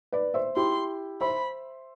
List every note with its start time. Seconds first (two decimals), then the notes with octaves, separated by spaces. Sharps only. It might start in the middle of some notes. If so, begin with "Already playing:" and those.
0.12 B4 D5
0.34 C5 E5
0.56 E4 G4 C6
1.21 C5 E5 B5